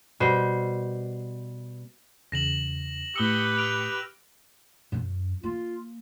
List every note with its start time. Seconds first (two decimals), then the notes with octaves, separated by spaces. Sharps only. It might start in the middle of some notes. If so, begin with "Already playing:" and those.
0.20 B2 G3 C5
2.32 E2 C#3 A#6 E7 F#7
3.16 A2 G4 B4 D#6 E6 C#7 G7
3.57 F6 D7 F7
4.92 F#2 C#4
5.43 A#3 F4